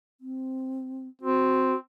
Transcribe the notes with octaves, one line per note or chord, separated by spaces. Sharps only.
C4
C4 F#4